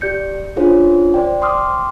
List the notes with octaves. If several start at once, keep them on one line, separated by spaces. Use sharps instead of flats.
G4 D5 G6 C#7
C#4 D4 F4 G#4 C5 C#5
C5 D5 G5
G5 C6 D6 D#6 F6